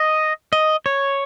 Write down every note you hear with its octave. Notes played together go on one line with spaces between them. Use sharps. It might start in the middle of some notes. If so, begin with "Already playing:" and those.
Already playing: D#5
D#5
C#5